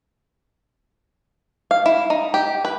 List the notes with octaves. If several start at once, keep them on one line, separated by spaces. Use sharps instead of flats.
F5
E4
D#4
G4
B4